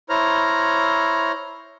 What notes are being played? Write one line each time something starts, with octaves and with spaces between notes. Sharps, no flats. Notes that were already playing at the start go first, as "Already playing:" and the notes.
E4 C5 C#5 A#5 F6